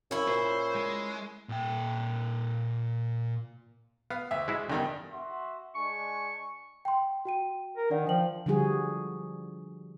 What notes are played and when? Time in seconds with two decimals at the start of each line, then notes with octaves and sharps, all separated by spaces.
0.11 F#2 C#4 E4
0.28 A#2 C5
0.75 G#3
1.49 A#2 G5
4.10 B3 F5
4.31 D2 E5
4.48 G#3 E4 F#4
4.70 E2 G2 D3 D#3
5.11 F#4 E5 C6
5.75 G#3 D4 G#5 C#6
6.85 G5 C6
7.25 F#4 G5 D#7
7.77 A#4
7.90 D#3 D4 D5 F#5
8.07 F3 G5 F#7
8.46 D3 F3 G3 F#4 G#4